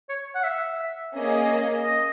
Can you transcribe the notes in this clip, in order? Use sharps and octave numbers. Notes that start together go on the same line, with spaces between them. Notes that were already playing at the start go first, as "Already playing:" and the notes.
C#5
F#5
E5
A#3 C#4 G#4 D#5
D#5